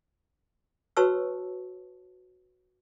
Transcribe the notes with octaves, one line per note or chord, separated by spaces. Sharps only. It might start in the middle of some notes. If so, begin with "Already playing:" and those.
F#4 B4 C#5 A5 C#6 E6